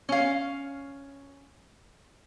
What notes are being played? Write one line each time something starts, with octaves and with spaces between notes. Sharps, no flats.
C#4 F5